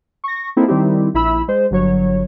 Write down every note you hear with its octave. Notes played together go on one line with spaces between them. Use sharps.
C#6 A#6
A#3 C4 D#4 E4 A4
D#3 G3 C4 D#4 E4 G4
A#1 E4 B5 E6
G#3 C5
G1 F#3 C#5